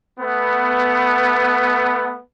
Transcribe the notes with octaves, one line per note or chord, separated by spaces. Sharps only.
A3 B3